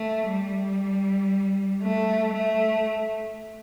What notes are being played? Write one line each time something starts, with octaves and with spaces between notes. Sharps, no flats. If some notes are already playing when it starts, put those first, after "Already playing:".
Already playing: A3
G3
A3
A3